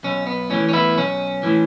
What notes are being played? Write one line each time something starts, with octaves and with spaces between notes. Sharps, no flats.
B1 C#4
B3
A2 E3 C#4
C#4
B3 E4
B1 C#4
A2 E3